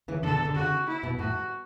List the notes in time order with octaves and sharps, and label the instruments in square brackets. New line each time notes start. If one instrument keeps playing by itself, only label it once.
[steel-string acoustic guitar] C#3 E3
[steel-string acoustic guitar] B2 D3 [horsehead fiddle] A4
[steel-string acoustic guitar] D3
[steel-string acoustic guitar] C#3 [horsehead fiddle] F#4
[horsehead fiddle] E4
[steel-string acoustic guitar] B2
[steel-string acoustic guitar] A2 [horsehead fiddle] F#4